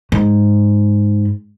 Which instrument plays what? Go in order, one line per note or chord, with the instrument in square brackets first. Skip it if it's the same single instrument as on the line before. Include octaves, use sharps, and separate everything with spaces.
[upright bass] G#2